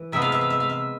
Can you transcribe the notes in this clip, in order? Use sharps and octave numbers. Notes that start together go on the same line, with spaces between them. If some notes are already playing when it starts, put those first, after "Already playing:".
Already playing: E3
C3 G#3 B3 E5
F5
E5
F5
E5
F5
E5